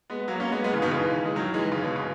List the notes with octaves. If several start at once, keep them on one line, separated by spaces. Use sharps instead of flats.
G#3 B3
F#3 A#3
A#3 C#4
G#3 B3
G#3 B3
C#3 E3
B2 D#3
C#3 E3
G#3
D#3 F#3
E3 G#3
C#3
B2
C#3